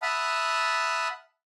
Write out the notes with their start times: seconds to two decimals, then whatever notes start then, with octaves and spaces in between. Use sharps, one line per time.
0.02 E5 F#5 A5 B5 D#6 F6